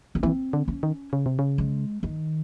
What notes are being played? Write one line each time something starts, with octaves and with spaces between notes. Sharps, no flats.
C#4
E3 C4
D3
C#4
D#3
C#3
C3
C#3
G#3
D#3